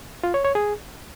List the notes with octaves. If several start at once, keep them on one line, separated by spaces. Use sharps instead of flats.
F4
C#5
C#5
G#4